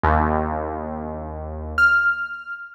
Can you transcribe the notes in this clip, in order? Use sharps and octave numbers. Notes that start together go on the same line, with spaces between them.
D#2
F6